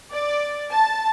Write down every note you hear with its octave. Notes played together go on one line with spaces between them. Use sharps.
D5
A5